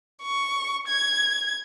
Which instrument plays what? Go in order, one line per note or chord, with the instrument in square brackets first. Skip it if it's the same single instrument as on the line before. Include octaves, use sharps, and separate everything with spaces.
[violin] C#6
G#6